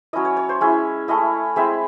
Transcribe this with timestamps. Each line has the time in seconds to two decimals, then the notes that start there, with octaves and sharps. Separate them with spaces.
0.13 F#3 C#4 E4 D#5
0.25 C#5
0.37 C#5
0.49 C5
0.61 G#3 C#4 E4
1.08 A3 C#4 E4 D#5
1.56 G#3 C4 E4 E5